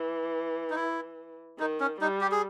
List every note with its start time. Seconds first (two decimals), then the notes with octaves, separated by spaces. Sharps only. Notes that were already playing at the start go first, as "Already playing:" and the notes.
Already playing: E3
0.70 D#4
0.76 E4
1.59 D#3 D#4
1.80 C#4
2.00 G3 D#4
2.21 G4
2.32 G#4